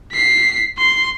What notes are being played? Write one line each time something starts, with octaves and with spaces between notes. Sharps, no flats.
B6 C7
C6